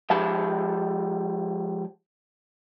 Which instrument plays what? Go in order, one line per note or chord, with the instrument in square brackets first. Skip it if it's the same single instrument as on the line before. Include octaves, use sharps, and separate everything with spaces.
[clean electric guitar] F3 G#3 G4 A5 B5